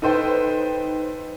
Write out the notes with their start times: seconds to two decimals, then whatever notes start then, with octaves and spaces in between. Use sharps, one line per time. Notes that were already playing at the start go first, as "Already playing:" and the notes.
0.02 D#4 A4 B4 C5 G5